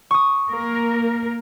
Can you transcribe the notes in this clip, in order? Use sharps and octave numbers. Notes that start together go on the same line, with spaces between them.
C#6 D#6
A#3 A#4